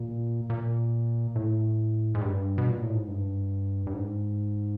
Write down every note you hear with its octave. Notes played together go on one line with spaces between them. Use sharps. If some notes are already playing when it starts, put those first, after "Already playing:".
Already playing: A#2
A#2
A2
G#2
G2
B2
A#2
A2
G#2
G2
G2
G#2